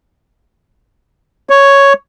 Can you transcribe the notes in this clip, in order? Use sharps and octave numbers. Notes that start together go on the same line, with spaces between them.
C#5